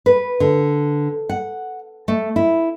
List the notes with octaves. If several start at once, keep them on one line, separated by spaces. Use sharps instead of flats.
B4
D3
F#5
A3
E4